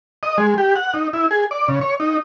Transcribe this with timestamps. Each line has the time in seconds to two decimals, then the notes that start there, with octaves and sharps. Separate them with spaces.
0.23 D#5
0.38 G#3
0.58 G4
0.76 F#5
0.94 D#4
1.13 E4
1.31 G#4
1.51 D5
1.68 C#3
1.81 C#5
2.00 D#4